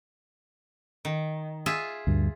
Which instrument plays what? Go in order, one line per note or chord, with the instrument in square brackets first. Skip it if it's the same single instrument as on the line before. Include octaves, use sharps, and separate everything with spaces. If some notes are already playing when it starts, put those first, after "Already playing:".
[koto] D#3
F4 G#4 E5
[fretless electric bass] D2 G2